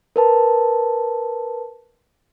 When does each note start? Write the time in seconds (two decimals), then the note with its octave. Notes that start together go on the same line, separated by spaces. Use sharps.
0.16 A#4 B4 A5